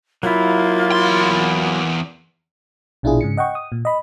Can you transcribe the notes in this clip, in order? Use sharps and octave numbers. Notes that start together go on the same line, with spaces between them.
F#3 A#3 E4 F4
E2 C6
A#1 B2 D4 E4 F4 G#4
G#2 C#3 C#7
D#5 F#5 G5 C#6
D#6
A#2
D#5 B5